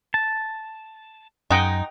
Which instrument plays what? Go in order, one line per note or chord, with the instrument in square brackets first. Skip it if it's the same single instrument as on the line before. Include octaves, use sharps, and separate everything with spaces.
[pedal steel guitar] A5
[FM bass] F#2 [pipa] G#3 D#4 [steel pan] D#5 F#5 G5